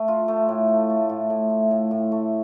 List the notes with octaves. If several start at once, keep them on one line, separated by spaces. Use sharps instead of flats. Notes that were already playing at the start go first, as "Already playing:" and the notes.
Already playing: A3
F4
A3
A2
A3
A3
A2
A2
A3
A2
A2
A3